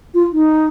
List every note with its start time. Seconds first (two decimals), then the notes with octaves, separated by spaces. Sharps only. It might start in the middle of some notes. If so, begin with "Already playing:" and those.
0.14 F4
0.33 D#4